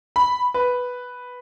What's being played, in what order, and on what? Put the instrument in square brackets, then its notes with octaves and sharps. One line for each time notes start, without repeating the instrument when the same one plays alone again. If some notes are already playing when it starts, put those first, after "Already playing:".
[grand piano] B5
B4